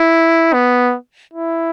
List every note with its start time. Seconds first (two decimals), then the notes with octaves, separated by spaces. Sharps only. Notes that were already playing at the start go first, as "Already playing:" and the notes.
Already playing: E4
0.53 B3
1.34 E4